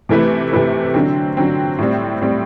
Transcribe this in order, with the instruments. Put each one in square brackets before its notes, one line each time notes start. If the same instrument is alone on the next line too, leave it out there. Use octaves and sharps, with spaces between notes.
[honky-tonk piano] C3 E3 A3 E4 B4
C3 E3 A3 E4 B4
D3 F#3 C4
D3 F#3 C4
A2 G3 C4
A2 G3 C4